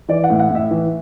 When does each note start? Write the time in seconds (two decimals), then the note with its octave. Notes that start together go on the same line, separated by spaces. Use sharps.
0.08 E3 D5
0.24 F#5
0.30 A2
0.39 F#5
0.51 A2 E5
0.71 E3